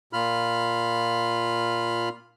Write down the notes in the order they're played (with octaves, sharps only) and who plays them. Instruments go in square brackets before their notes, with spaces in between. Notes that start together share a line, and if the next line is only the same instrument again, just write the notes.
[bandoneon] A#2 F4 B5 F6